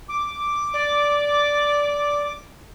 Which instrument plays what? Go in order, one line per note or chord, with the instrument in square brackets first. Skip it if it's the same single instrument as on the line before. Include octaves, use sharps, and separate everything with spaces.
[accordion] D6
[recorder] D5